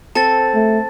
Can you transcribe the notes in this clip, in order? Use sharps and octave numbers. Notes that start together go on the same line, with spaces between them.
C4 A4 A5 A6
A3